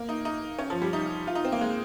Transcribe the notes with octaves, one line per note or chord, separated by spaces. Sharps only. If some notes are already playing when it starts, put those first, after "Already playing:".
Already playing: A#3
D#4
D#4
C#4
F3
G3
D#4
F4
D#4
C4
A#3
G#3